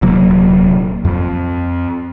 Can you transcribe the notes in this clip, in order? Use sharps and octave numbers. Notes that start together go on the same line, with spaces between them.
D#1 C3 F#3 A#3
F2